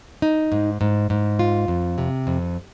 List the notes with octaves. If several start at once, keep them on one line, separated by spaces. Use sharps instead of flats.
D#4
G#2
G#2
G#2
F4
F2
C3
F2